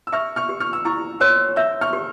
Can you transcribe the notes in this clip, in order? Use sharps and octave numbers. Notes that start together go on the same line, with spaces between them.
E6
E5 C#6 F6
C#6 F6
G4
C#6 F6
E6
E4 A#5 C#6
C#5 C6 E6
E5 E6 G6
C#6 F6
G4